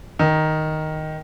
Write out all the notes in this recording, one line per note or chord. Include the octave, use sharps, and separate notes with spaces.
D#3